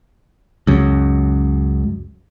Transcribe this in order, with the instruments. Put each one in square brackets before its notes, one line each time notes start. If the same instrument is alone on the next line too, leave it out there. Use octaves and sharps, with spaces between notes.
[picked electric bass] C#2 F#2